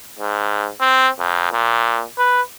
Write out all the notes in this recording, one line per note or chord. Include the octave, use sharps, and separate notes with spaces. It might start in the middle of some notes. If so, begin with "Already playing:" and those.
G#2
C4
F2
A#2
B4